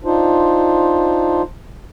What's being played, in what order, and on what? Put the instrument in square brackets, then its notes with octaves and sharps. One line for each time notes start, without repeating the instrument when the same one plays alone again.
[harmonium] D4 D#4 F4 C5